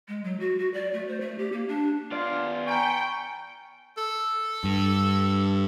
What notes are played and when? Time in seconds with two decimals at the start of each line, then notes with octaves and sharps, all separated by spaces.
0.08 G#3
0.24 F#3
0.40 F#4
0.59 F#4
0.74 D5
0.93 A3
1.08 C5
1.20 A3
1.38 G4
1.52 A#3
1.68 D4
2.12 B3 F4 D5
2.67 G5 G#5 A#5 B5 C#6
3.97 A4
4.64 G2